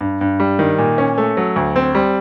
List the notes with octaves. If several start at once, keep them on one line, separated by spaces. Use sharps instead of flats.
G2
G2
G3
D#3
A#2
C#4
A3
F#3
D2
C4
G3